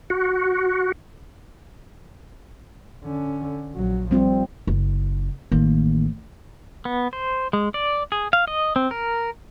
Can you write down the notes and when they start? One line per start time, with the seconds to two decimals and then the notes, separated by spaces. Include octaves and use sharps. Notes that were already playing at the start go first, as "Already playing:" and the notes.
0.10 F#4
3.04 D3 C#4
3.75 A#1 F#3
4.11 F3 G3 C4 F4
4.67 F#1
5.52 A1 D#3 A#3
6.85 B3
7.13 C5
7.53 G#3
7.74 D5
8.12 G#4
8.33 F5
8.48 D#5
8.76 C4
8.91 A#4